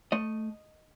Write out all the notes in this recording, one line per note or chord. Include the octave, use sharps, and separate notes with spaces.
A3 D#5